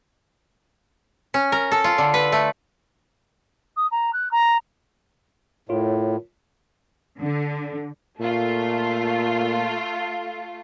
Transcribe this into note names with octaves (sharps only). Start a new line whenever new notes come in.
C#4
A#4
A4
F4
D3
B4
A3
D#6
A#5
F#6
A#5
A2 F4 A#4 C#5
D3
A#2 A3 F4